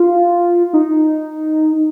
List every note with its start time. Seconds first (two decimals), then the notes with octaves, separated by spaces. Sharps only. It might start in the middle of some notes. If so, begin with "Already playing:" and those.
Already playing: F4
0.74 D#4